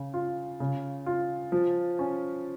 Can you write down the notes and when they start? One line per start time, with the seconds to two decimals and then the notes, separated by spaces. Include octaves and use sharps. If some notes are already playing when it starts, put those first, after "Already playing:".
Already playing: C#3
0.14 F4
0.60 C#3
1.06 F4
1.52 F3
1.99 C#4